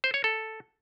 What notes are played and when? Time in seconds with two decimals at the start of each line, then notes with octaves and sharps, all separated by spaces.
0.04 C5
0.14 C#5
0.24 A4